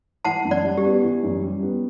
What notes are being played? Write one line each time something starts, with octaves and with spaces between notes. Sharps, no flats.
E3 F#5 A5
F#2
D5 F#5
G3
G4
B3
E3
F#2
G3
B3